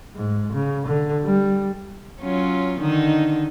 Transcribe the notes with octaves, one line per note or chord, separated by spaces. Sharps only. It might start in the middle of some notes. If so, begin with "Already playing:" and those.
G#2
C#3
D3
G3
F#3 C#4 F4
D3 D#3 D#4